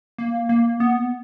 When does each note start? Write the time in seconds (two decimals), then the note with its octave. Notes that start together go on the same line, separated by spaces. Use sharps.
0.18 A#3
0.49 A#3
0.80 B3